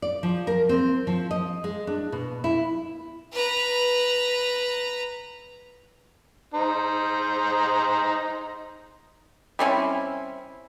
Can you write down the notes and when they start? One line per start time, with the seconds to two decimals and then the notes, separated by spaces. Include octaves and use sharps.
0.02 D5
0.23 F3
0.47 A#4
0.69 C4
1.07 F3
1.31 D#5
1.64 G#3
1.87 D4
2.12 B2
2.44 E4
3.33 B4 A#5
6.54 D#4 C5
9.59 G3 C4 C#4 E4